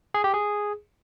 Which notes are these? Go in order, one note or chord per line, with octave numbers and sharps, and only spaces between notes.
G#4
G4
G#4